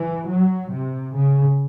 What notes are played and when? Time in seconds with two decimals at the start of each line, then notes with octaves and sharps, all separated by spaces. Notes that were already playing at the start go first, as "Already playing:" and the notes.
Already playing: E3
0.28 F#3
0.73 C3
1.17 C#3